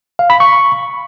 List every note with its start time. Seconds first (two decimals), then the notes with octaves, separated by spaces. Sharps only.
0.19 F5
0.30 B5
0.40 C#6